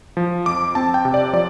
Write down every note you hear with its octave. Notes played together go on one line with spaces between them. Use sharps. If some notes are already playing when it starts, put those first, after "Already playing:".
F3
F2 D6
C4 A5
G5
C3
D5
F3 D5